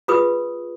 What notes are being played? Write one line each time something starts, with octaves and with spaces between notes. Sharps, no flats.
F4 G#4 B4 D#6